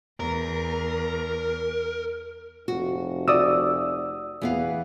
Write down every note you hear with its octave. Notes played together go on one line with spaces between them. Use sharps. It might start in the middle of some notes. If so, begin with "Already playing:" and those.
E2 A#4
F1 F#4
F#4 D5 D#6 E6
E2 E3 B3 F5